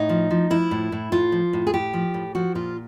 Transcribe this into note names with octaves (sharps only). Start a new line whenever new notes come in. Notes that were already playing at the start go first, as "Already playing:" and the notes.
Already playing: A2 D#4
F3
F3
F3 E4
A2
A2
A2 F4
F3
A2
G#4
A2 G4
F3
A2
F3 F#4
A#2 F4